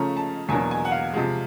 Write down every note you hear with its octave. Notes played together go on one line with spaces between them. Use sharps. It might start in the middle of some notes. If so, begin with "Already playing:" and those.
Already playing: C#3 F3 A3 C#4 A#5
A5
E2 B2 F#3 A#3 D4 G#5
G#5
F#5
F5
C3 F3 G#3